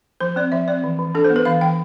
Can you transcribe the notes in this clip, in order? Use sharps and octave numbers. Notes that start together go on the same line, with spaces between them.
F3 C5
C4 D5
F3 E5
C4 D5
E3
E3
D4 A4
C5
B3
B4
E3 F5
E3 G5